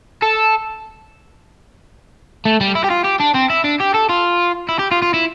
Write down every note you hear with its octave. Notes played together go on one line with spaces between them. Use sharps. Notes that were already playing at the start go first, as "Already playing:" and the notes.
A4
A3
G3
E4
G4
F4
G4
D4
C4
E4
D4
G4
A4
F4
E4
G4
F4
F4
E4